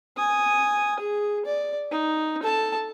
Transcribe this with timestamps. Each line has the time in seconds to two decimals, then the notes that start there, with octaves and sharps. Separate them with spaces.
0.17 G#5 D#6
0.99 G#4
1.45 D5
1.91 D#4
2.43 A4 A5